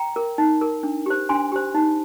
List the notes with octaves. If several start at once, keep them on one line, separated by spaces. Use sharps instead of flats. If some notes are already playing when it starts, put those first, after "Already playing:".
Already playing: G5 A#5
A#4
D#4
A#4
D4
G4 C5
D4 G#5 C6
G4 C5
D#4